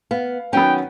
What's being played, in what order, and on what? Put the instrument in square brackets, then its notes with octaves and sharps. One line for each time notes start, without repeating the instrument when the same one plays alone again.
[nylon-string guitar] B3 [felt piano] F5
[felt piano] D#3 F#3 B3 [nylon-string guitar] C#4 [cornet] G5